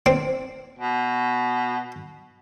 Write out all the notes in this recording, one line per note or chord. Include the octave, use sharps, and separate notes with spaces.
C4
B2